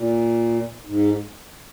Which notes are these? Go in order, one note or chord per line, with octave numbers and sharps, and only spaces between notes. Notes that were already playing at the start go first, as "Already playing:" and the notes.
Already playing: A#2
G#2